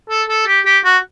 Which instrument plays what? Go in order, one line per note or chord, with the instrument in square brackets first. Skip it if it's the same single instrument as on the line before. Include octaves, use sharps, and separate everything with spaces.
[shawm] A4
A4
G4
G4
F#4